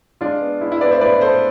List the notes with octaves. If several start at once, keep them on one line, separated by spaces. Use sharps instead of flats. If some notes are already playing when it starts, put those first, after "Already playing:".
G#3 D4 F4
B3
G#3 E4
E4
B3 B4 D5
C5 E5
A2 B4 D5
B3 A4 C5